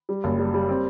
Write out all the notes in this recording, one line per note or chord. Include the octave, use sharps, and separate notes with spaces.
G3
F#1
G3
G3
C4